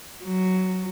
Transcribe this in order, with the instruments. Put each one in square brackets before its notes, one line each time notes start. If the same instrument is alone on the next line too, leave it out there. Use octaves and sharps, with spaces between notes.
[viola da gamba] F#3